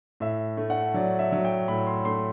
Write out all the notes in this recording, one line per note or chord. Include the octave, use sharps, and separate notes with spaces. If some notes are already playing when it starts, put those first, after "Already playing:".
A2 E5
A3
F#5
F#3 D5
E5
F#3
G5
A2 B5
C6
A3 C6